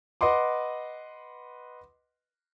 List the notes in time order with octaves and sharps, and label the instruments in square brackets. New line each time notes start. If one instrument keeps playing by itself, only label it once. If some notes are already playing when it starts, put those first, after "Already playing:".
[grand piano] B4 D#5 F#5 C6 D6